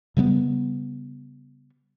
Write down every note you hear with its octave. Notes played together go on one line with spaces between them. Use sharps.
C#3 G3 A#3 B3